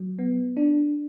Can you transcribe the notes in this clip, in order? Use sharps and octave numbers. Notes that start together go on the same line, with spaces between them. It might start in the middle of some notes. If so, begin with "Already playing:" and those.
Already playing: F#3
B3
D4